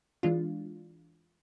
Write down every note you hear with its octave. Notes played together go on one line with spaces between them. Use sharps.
E3 G#3 D4 F4